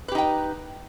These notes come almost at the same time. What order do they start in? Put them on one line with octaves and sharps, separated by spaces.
B4 G4 D#4 G5